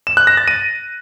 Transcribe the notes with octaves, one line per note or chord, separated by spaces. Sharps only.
E7
F#6
A#6
A6
D#7